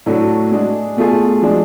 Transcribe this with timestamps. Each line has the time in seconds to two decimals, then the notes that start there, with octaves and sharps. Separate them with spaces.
0.06 A2 F#3 A3 D4 F#4
0.51 G#3 D4 G#4
0.97 B2 A3 F4 G#4
1.42 F3 G#3 D4